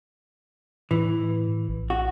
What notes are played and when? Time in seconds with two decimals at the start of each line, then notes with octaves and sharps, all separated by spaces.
0.91 A2 E3
1.68 A#1
1.90 F#4